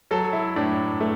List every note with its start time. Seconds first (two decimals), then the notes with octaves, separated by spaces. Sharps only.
0.11 F#3 A4
0.33 E4
0.56 A2 D4
1.01 A3